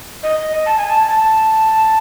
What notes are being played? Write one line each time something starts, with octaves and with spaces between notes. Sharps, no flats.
D#5
A5
G#5
A5
A5